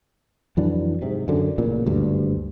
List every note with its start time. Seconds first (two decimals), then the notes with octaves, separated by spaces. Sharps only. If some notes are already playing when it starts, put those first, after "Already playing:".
0.57 F2 E3 F#3 D4
1.02 G#2 C3
1.28 F#2 D3
1.58 A1 A#2 C#3
1.86 F#1 D2 G2